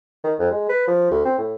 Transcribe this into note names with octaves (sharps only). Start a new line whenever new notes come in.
D#3
F2
G#3
B4
F3
D2
C4
A2